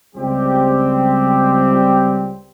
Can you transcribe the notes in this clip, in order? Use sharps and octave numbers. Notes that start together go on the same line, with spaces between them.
C#2 G3 C4 G4